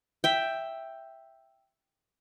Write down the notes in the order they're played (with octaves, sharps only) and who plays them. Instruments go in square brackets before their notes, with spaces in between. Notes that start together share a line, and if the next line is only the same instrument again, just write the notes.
[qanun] E5 G5